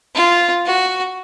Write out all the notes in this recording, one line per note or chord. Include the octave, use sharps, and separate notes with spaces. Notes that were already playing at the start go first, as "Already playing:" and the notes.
F4
F#4